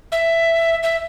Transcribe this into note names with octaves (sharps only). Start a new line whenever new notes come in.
E5
E5